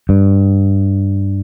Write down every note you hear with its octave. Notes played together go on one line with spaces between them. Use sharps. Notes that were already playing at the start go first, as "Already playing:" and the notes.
G2